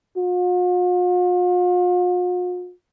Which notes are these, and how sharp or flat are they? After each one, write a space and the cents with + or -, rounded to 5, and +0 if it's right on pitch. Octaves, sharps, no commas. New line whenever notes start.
F4 +45